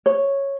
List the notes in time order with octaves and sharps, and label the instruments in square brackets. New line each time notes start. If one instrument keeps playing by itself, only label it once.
[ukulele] C#5